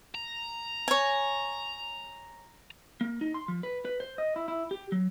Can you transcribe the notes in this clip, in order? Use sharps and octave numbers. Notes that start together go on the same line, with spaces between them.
A#5
C#5 G#5
A#3
D#4
C6
F3
B4
B4
C5
D#5
E4
E4
G4
F#3